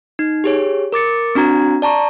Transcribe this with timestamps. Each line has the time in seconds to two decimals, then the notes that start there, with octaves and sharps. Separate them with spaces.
0.19 D#4
0.44 G4 G#4 C#5
0.92 A#4 D6 A6 C#7
1.35 C4 D4 F#4 A#5 G#6
1.82 D5 A5 A#5 C#6